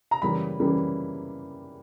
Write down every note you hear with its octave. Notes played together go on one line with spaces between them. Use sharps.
A#5
F#2 C#3 E3 G3 A#3 B5
F#2 C#3 E3 G3 A#3